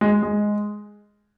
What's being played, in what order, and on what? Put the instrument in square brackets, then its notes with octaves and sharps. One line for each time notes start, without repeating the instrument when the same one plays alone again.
[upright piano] G#3
G#3